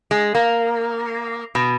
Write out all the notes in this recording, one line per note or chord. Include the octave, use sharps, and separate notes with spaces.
G#3
A#3
B2